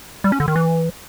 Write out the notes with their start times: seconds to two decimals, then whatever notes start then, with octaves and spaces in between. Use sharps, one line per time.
0.24 G3
0.32 C#4
0.40 D3
0.48 D#3
0.56 E3